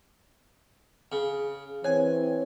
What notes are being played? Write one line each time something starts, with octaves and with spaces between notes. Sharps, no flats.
C#3
E3 C4 C#5 G#5